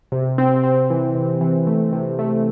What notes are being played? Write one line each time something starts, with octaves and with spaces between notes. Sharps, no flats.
C3
C4
C4
E3
C3
E3
A3
C3
A3